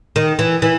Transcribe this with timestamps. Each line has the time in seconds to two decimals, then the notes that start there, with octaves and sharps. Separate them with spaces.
0.16 D#3
0.39 E3
0.62 E3